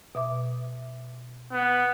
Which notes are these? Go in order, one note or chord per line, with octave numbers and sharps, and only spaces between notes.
B2 E5 D6
B3